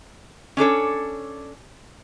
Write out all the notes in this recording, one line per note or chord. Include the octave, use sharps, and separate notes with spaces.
C#4 D4 A4 C#5